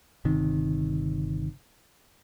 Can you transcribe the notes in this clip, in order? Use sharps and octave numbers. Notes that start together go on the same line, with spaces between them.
G1 C3 D#3